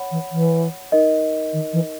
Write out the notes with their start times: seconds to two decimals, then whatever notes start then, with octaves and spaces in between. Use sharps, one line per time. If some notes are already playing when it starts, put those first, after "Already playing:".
Already playing: C#5 F#5 B5
0.11 E3
0.31 E3
0.92 D#4 A#4 D#5
1.53 D#3
1.73 E3